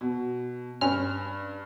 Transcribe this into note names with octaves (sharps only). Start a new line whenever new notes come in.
B2
G2 C#4 F6